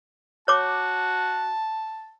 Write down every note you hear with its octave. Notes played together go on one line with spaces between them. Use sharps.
F#4 C#5 A5 D6